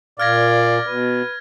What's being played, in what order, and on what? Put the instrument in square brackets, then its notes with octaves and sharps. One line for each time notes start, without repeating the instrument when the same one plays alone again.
[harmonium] A#2 [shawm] D5 [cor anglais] F5 [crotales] F6 G#6 A#6
[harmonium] B2 [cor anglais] B4